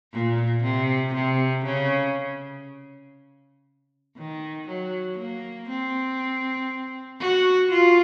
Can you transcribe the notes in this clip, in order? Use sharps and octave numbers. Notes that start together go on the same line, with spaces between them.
A#2
C3
C3
C#3
D#3
F#3
A#3
C4
F#4
F4